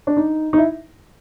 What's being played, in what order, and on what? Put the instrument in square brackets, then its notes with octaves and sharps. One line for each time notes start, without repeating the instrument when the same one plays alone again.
[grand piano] D4
D#4
D#4
E4